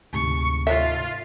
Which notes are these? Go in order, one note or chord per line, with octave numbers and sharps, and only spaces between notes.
D2 G#2 C3 C#6
F4 E5